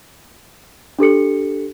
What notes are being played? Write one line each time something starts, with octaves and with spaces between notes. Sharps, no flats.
D4 G4 A4 C#7